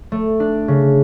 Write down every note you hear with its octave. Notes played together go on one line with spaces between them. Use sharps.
A3
D4
C#3